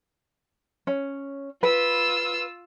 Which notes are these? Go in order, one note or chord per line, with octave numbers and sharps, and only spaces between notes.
C#4
F4 B4 E6